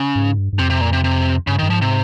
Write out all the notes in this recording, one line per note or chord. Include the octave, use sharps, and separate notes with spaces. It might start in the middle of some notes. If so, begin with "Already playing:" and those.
Already playing: C#3
G#2
G2
G2
F2 C3
C3
A#2
C3
C3
G2 C#3
D#3
G2
G#2 F3
C3